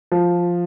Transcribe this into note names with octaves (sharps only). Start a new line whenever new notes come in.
F3